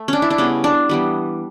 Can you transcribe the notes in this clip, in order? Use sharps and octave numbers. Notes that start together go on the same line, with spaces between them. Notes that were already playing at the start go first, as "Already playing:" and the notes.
Already playing: A3
C#4 D4
E4
D4
C#3 G3 B3 C#4
D4
E3 G3 B3